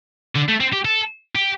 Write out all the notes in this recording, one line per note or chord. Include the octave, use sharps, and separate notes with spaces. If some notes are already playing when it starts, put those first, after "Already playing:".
D3
A3
C4
G4
A4
G4